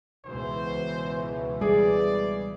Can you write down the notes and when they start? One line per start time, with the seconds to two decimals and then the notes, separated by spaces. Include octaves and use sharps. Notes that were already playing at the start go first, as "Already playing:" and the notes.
0.25 C#2 B2 E3 C5
1.61 G3 G#4 D5